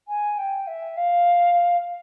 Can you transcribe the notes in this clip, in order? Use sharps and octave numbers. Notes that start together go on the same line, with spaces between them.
G#5
G5
E5
F5